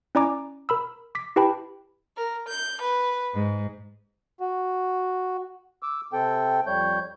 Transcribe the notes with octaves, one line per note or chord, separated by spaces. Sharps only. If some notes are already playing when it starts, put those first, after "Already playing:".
C#4 E4 D5 G#5 A#5 D6
A#4 B5 E6
D6 B6
E4 G4 B4 G5 A5 B5
A#4
G6
B4
G#2
F#4
D6 E6
C3 C4 A4 G5
F2 G3 C#5 G6